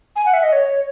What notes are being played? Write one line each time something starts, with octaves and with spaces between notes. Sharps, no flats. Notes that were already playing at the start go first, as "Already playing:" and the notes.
G#5
F#5
E5
D#5
C#5